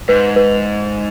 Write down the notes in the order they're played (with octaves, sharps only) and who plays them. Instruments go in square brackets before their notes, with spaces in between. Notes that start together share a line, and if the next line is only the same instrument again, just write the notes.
[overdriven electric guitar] G#2 [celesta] B4
[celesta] B4